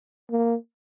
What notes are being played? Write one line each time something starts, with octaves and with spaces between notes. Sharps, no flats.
A#3